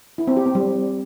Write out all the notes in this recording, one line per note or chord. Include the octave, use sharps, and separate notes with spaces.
E4
C4
G4
C4
G3